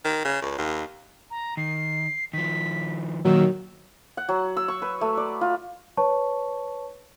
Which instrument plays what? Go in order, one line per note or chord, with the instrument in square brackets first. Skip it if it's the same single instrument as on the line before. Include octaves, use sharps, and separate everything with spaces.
[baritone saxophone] D#3
C#3
C#2
D#2
[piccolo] A#5
[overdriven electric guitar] D#3 [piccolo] C7
[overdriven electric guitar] D#3 F3 [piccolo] B6
[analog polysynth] A#2 D#3 [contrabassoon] F#3 [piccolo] E6
[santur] F#5
F#3
E6
C#6
B4
A3
D5
F4
[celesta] B4 C#5 A5 C#6